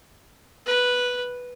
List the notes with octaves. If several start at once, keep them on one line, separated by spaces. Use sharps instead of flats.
B4